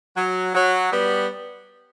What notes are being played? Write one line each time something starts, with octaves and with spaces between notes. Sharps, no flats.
F#3
F#3
G3 B3